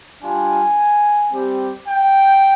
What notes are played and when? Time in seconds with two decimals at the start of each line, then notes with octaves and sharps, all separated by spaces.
0.22 G3 D4 F4 G#5
1.32 G3 C4 G4
1.87 G5